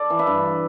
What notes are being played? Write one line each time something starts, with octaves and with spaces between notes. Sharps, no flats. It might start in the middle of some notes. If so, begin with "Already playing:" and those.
Already playing: A4 D5
E3
B4 E5
G2